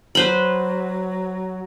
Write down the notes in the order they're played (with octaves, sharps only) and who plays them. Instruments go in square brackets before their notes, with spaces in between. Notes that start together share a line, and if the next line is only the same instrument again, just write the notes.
[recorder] F#3 [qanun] B4 C5 B5